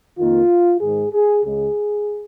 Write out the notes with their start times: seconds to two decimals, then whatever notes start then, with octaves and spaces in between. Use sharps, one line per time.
0.18 F2 D#3 A#3 F4
0.81 G#2 D#3 G#3 G#4
1.13 G#4
1.44 C#2 C#3 G#3 G#4